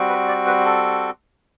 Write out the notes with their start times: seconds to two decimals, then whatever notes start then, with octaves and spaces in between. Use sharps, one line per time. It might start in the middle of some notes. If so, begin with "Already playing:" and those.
Already playing: G3 C4 F#4
0.09 B4
0.28 D5
0.47 B4
0.65 A4